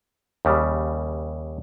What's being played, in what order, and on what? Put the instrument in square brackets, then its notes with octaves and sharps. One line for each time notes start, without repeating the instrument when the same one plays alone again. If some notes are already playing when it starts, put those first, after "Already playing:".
[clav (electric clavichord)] D#2 C#3 G3